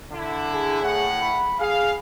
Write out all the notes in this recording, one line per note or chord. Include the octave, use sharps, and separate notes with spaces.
D3 E4
G#4
A2 F#5
B5
G#4 F5